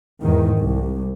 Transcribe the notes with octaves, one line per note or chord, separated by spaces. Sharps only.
E2 G#2 D#3
C2